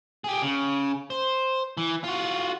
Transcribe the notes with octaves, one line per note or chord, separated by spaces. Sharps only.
G4 G#4
C#3
C5
E3
F4 F#4